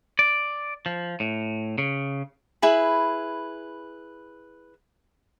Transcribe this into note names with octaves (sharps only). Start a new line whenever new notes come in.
D5
F3
A2
C#3
E4 G#4 B4 B5